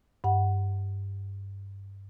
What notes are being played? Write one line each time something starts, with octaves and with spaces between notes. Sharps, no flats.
G2 F#5